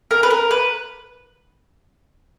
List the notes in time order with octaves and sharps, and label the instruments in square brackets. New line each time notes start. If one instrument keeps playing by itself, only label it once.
[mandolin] A#4
B4
A#4
B4